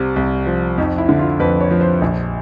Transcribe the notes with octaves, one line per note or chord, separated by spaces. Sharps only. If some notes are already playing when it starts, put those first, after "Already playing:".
Already playing: C2 C3
C2
F3
F2 D#4
E4
D3
F4
F2 B4
C#5
F3
C5
A#1